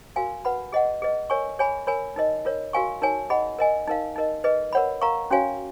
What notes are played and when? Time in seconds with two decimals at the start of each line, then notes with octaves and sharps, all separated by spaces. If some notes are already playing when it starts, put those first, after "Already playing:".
0.16 F#4 A#4 F5 G#5
0.45 B4 F#5 B5
0.72 G#4 D#5 F#5
1.02 G#4 B4 D#5
1.30 A#4 C#5 G#5 C#6
1.59 G#4 C#5 G#5 B5
1.87 A#4 C#5 G#5 B5
2.16 D#4 A#4 D#5
2.45 F4 A#4 C#5
2.73 F#4 A#4 F5 G#5 C#6
3.02 D#4 A#4 C#5 G#5
3.30 G#4 D#5 F#5 B5
3.59 A#4 D#5 G#5
3.88 D#4 A#4 F5
4.16 D#4 A#4 D#5
4.44 G#4 B4 D#5
4.73 A#4 C#5 F#5 B5
5.01 A#4 F5 A#5 C#6
5.31 C#4 F#4 C#5 F5 G#5